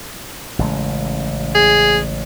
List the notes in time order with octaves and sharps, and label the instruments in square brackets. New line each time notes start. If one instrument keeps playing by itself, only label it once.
[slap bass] A1 C#3 G#3
[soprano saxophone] G#4